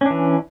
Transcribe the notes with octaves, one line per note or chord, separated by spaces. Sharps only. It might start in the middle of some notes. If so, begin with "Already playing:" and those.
E3 C#4 D4